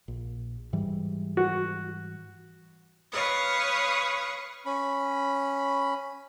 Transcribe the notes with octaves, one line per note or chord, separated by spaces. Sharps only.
A#1
G#2 E3 G3
F#4
B4 C#5 F5 C#6 D#6
C#4 B5